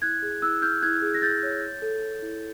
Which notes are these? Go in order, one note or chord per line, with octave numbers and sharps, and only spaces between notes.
E4 F#6 G#6
G#4
E4 E6 F#6
E4 F6 G6
E4 F#6 G#6
G#4
A#6
G#4 G6 A6
C#5
C#5
A4
C#5
E4